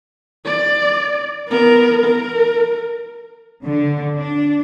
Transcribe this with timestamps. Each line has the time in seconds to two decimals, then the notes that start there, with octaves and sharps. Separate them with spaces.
0.46 D5
1.49 B3 A#4
2.05 A#4
3.65 D3
4.18 D4